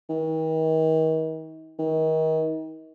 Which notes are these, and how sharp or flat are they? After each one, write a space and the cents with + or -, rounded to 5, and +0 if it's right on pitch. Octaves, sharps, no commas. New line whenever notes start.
D#3 +40
D#3 +35